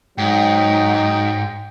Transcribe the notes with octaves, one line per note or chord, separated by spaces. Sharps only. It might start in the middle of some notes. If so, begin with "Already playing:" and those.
G#2 F#3 D#4 G5